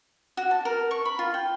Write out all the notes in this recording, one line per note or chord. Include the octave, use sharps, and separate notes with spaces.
F#4
A5
A#4
C#6
B5
F4
G5